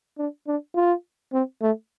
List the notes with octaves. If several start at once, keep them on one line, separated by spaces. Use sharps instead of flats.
D4
D4
F4
C4
A3